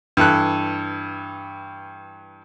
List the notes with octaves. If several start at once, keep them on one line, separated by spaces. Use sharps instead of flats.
G2 E3 A4 F#6